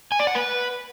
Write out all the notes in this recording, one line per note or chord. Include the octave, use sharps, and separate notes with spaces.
G#5
D5
F#5
B4